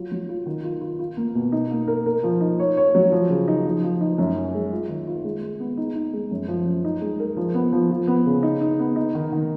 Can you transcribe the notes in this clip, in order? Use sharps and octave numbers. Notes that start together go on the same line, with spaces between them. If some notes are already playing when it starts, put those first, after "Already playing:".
Already playing: F#3 F4
F#3
F4
D#3
F4
F4
F4
A#3
B2
D#4
A#3
A#4
A#4
F3
D#4
C#5
C#5
F#3
F3
C#3
D#4
F3
F3
D#4
F#2
C#4
G#3
F4
D#3
F4
G#3
G#3
B3
D#4
D#4
G#3
F#2
F3
F#2
D#4
G#3
A#4
F3
B3
F3
F3
B3
C#3
D#4
D#4
B3
D#4
D#3
D#3